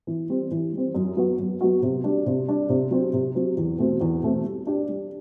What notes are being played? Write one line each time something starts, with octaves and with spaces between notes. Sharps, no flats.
E3
G3 C4
E3
G3 C4
F#2
F#3 B3 F#4
F#2
F#3 B3 F#4
C3
G3 D4
C3
G3 D4
C3
F#3 C4
C3
F#3 C4
E2
B2 A3 C4
E2
B2 A3 C4
G3
D4 G4
G3